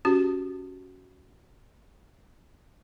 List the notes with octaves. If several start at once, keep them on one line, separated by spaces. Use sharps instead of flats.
C#4 F#4 G4